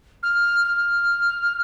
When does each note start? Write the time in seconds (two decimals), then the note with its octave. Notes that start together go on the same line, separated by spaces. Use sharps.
0.23 F6
0.64 F6